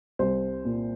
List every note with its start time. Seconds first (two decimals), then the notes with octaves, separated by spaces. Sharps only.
0.19 C2 C5
0.65 A#2